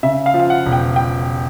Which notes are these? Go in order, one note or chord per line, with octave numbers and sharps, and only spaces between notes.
C#3 E5
F5
F3
F5
F#5
E1
G5
G5